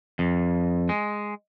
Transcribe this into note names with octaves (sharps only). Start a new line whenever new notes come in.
F2
G#3